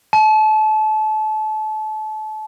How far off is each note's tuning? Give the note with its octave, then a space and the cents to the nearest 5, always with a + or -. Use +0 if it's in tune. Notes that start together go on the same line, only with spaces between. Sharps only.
A5 -30